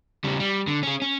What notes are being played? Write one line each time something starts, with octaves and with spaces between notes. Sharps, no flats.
C#3 G3
G3
D3
C#4 G#4
C#4